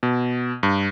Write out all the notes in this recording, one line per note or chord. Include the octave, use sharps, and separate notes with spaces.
B2
G2